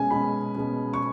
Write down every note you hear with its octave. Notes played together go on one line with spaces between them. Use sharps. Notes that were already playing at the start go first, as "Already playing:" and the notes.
Already playing: B2 G#3 C#4 G#5
B2 G#3 C#4 B5
B2 G#3 C#4
C#6